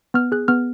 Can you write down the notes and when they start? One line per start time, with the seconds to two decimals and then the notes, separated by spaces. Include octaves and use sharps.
0.14 B3 F6
0.32 G#4 F#6
0.48 B3 F6